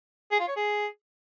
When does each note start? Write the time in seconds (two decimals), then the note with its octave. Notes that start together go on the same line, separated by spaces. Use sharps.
0.31 G#4
0.40 F4
0.48 C#5
0.56 G#4